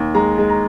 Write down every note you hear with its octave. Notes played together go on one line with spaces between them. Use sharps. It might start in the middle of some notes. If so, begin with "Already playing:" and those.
Already playing: D#2
G#3 A#5
G#3
A#5